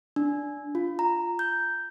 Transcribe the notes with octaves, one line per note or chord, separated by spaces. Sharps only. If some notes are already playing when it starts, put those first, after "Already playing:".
D4
F4
A#5
G6